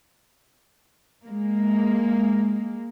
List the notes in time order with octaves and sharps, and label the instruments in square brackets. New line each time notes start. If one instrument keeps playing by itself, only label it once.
[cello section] G#3 A#3